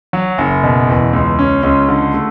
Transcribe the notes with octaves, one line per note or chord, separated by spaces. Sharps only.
F#3
F#1
B2
E2
C#2
C#4
C#2
D3
A3